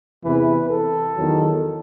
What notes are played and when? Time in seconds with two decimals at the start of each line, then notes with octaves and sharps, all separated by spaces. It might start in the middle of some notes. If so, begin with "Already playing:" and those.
0.25 E2 C3 E3 B4
0.70 A4
1.17 E2 D#3 F#3